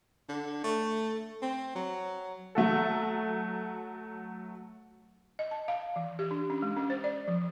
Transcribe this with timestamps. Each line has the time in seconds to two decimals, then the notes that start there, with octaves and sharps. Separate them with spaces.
0.29 D3
0.64 A3
1.42 C4
1.75 F#3
2.55 F#3 A3 F#4 A4
5.39 D#5
5.51 A5
5.68 F5
5.96 E3
6.19 G4
6.31 D4
6.50 C#4
6.62 G#3
6.76 C#4
6.90 C5
7.04 D5
7.27 F3